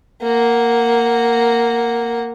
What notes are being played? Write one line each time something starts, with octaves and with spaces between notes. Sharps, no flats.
A#3 F#5